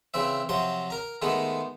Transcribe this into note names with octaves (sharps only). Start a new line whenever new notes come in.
C#3 E3 C4 E5
C3 F3 F#3 C6
A#4 A#5
D#3 G#3 A3 B3